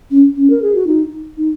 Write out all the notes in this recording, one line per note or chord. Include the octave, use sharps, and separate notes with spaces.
C#4
C#4
A#4
G#4
F#4
D#4
D#4